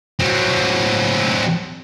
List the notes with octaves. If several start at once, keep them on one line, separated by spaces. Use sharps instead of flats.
F#3 C4